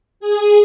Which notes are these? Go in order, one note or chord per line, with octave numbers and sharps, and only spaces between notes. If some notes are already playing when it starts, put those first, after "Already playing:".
G#4